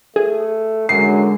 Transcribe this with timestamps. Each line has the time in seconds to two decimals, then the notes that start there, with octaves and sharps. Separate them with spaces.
0.16 A3 G#4
0.89 F#2 D3 G#3 C7